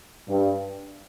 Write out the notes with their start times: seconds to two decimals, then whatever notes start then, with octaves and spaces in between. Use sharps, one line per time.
0.28 G2